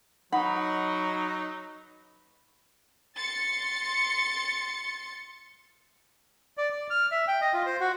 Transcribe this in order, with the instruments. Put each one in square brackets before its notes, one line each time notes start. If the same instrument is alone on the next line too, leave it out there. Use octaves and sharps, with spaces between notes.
[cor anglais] F#3 [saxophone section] D#4 [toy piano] F#5 [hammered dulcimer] B5
[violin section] C6 A6 C#7
[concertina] D5
D5
F6
E5
G5
D#5
F4
C5
F#4